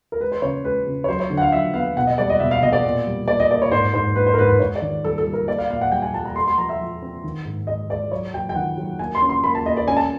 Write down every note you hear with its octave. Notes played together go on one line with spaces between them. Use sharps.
A#4
G#3 B4
C5
C#3 C#5
G#3 B4
C#3
C#5
F#3 C5
C#5
D3
F#5
F5
F#3 E5
B3 F5
B2 F#5
D#5
G3 D5
D#5
B2 E5
F5
B2 D#5
D5
A#2
G3
A#3 D5
D#5
A#3 D5
C#5
G#2 C5
G#2 C5
G#2 B4
C5
A#4
G#2 B4
B4
G#2 C#5
D5
D#3
G3 A4
A4
G3
A#4
A#3 D5
F5
A#2 F5
F#5
G3 G5
G#5
G3 A5
A#5
A3 C6
C6
F3 A#5
E5
F3
C4
D#3
G#2
G#3 D#5
G#3 D5
F#3 C#5
F#3 G5
G5
D#3 F#5
F#3
A#3 G#5
C6
C#4
C6
A#3 B5
A5
A#3 D#5
D5
C#4 G#5
A5